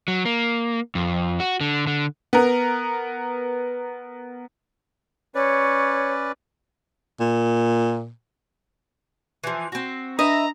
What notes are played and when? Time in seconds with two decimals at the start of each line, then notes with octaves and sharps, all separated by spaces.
0.08 F#3
0.26 A#3
0.95 F2
1.40 F#4
1.61 D3
1.87 D3
2.33 B3 A#4
5.35 C#4 B4 C#5 D5
7.20 A#2
9.44 E3 F3
9.72 C4 F#4
10.19 D4 B4 D#5 E5 A#5